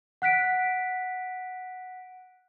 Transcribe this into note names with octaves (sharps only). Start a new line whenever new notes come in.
F#5 F#6 B6 D7